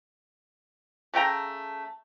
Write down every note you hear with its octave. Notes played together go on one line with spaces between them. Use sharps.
C#3 A3 G5 A#5